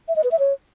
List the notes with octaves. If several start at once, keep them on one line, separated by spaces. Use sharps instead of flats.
E5
D#5
B4
E5
C#5